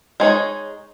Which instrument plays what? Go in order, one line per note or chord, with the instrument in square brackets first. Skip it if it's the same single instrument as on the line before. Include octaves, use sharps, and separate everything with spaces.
[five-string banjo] G#3 D#4 G#4 C#5